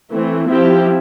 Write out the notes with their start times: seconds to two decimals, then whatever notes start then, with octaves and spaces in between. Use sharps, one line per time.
0.12 E3 A3 C4
0.49 F3 C4 E4 G4